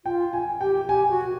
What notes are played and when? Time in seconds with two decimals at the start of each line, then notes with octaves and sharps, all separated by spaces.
0.05 F4 G5
0.33 G#5
0.61 G4 G5
0.89 G4 G#5
1.10 F#4